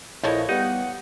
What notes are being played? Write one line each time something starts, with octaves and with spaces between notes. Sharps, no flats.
A#1 E3 F3 E4 A4 C#5 D#5
G3 B3 D#4 G4 F#5